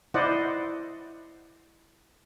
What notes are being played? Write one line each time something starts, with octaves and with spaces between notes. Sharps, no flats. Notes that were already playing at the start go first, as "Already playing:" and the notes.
E4 C5 D5 D#5 F#5